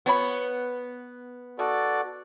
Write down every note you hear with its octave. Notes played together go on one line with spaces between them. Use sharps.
F3 B3 C#5 B5
D#3 F#4 A4 D5